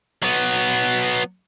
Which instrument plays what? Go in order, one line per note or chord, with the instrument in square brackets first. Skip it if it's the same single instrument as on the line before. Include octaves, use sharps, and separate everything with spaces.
[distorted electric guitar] F#3 B3